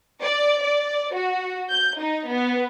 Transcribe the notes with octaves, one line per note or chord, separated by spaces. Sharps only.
D5
D5
F#4
G6
D#4
B3